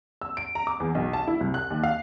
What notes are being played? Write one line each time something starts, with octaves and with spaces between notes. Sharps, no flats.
E6
D7
A#5
D6
E2
B1
A5
E4
C2
F#6
D#2
F5